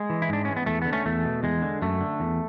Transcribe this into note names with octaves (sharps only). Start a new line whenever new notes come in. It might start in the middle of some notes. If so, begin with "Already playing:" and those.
Already playing: G#3
E3
E4
G#2 D4
E3 C#4
B3
E2 A3
D3 B3
A3 C#4
E2 A3
B2
E2 G#3
D3
F#2 A3
D3
E2